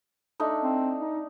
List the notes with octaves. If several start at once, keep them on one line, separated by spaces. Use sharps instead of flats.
A3 D4 D#4
C4
D#4